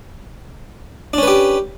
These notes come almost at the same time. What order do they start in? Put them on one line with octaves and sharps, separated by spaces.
D4 C#4 B4 G4